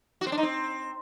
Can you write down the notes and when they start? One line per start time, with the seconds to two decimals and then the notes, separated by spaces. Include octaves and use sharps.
0.21 F#4
0.27 C4
0.32 D4
0.38 D#4
0.43 C4